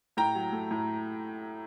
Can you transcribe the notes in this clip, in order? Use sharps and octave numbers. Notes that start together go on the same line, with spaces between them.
A2 G5 A#5
F#3
A3
A2